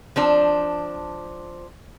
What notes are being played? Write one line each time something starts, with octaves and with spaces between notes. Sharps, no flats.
F3 C4 D4